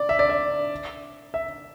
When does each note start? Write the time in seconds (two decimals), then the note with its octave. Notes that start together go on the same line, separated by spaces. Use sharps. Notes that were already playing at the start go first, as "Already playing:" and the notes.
Already playing: D5
0.09 E5
0.19 D5
0.29 E5
1.34 E5